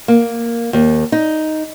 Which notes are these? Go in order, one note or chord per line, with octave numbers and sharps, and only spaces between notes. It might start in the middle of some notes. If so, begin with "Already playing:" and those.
A#3
D#2
D#4